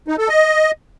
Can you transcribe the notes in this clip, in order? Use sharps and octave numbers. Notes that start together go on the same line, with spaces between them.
D#4
A4
D#5